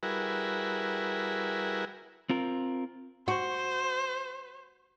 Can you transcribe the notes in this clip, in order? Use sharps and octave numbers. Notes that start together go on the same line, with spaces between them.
G3 E4 F#4 G#4 A#4 B4
C4 F4 A#4
F#4 C5